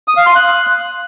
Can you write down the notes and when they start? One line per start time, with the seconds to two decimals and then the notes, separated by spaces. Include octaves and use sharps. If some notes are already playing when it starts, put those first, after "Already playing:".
0.08 D#6
0.17 F5
0.26 C6
0.36 F#6